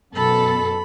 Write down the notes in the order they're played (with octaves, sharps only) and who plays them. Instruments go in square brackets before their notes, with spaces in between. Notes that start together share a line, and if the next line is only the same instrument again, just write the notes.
[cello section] F#2 B2 A4 [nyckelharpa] B5